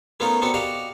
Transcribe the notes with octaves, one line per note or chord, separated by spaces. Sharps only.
A3 B3 C#4 D#4 F4 A#4
B3 C4 D4 F#4 A4
F#4 G4 D5 D#5 F5 G5